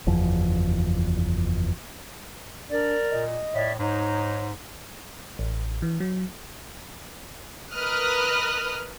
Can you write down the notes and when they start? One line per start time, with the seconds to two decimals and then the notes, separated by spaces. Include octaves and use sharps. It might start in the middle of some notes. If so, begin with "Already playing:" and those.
0.07 F#1 E2 F3
2.70 D4 A#4 D5
3.11 A#2 D#5
3.54 A2 C#5 D5 E5
3.79 G#2 D#4 C#5 A#5
5.39 A1
5.82 E3
6.00 F#3
7.74 A#4 B4 D#5 D#6 F6 F#6